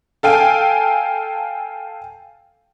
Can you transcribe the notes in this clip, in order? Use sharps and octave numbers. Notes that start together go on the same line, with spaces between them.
A4 F5 G5 G#5